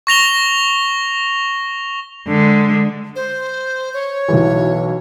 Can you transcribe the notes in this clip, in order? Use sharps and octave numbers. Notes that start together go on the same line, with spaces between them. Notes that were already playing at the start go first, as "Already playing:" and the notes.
C#6 A#6 F7 G7
D3 G#3
C5
C#5
B1 E3